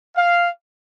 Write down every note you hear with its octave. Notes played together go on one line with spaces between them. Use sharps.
F5